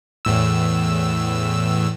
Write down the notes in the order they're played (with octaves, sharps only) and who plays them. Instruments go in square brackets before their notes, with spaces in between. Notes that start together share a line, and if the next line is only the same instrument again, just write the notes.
[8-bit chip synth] E2 A2 E6